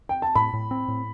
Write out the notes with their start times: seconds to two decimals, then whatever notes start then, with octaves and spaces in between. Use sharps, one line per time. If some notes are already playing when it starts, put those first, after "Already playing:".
0.09 G5
0.22 A5
0.35 A2 B5
0.53 A2
0.71 C4
0.88 A2